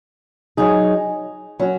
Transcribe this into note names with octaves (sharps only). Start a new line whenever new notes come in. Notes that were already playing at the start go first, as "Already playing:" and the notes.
F#3 D#4 G#4
F#3 C#4 F#4